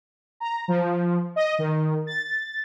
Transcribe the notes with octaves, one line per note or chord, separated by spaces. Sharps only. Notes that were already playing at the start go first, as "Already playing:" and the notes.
A#5
F3
D#5
D#3
A6